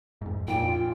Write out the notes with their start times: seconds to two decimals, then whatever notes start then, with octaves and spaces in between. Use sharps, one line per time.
0.22 F2 G#2
0.48 A#1 F2 A#2 G5
0.67 F4